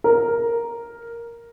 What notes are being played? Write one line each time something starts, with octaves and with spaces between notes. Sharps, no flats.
A#4